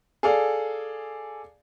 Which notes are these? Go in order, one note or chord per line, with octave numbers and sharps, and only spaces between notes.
G#4 A4 D5 F5